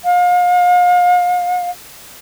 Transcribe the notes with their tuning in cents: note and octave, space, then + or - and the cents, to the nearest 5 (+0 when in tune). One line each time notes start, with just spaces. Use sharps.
F5 +35